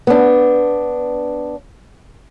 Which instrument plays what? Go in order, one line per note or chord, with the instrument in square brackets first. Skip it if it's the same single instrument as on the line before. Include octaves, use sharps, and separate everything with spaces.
[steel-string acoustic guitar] B3 D4